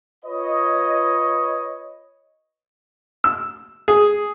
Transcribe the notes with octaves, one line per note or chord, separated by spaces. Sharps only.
F4 B4 C#5 D#5
E6
G#4